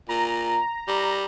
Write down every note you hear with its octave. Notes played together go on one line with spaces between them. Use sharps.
A#2 A#5
G3